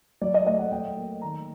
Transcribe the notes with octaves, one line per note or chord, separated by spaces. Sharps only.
F#3 D5
D#5
A3 D#5
F#5
F#3 G5
A#3
D#3 A#5